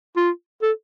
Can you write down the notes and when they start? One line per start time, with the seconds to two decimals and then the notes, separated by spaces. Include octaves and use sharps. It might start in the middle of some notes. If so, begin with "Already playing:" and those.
0.17 F4
0.63 A4